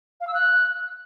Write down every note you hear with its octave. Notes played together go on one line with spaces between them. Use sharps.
F5
E6
F#6